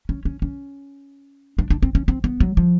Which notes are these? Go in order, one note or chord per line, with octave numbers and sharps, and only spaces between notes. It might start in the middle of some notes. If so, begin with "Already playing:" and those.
C#4
C#4
C#4
D4
D4
C4
C#4
C4
B3
F#3
F3